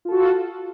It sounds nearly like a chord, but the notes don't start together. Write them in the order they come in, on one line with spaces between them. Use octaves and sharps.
F4 A4 F#4